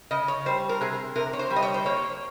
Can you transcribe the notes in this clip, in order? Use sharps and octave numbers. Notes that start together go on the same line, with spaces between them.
C#3 D#5
C#5
G3 C5
A#4
C3 G#4
C3 A#4
C#5
C5
G3
D#5
C#5
C5
A#3 C#5